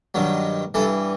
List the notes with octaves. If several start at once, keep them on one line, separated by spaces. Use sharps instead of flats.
G2 D#3 F#3
G2 E3 A4